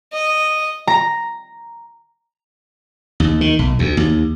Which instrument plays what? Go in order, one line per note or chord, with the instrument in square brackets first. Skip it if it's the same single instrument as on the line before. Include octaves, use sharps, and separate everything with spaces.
[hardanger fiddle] D#5
[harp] A#5
[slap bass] D#2
D#3
B1
D2
D#2